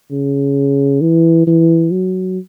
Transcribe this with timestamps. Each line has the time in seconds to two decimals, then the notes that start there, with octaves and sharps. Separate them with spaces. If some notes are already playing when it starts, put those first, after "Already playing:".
0.11 C#3
1.01 E3
1.47 E3
1.91 F#3